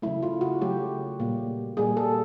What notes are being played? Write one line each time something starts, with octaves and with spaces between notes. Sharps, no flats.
C#3 F#3 A3 E4
F4
F#4
C#3 F#3 A3 G4
A#2 G3 A#3
A#2 G3 A#3 G#4
A4